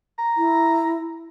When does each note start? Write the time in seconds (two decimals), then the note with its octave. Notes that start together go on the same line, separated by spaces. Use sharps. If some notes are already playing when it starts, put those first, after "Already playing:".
0.18 A#5
0.37 E4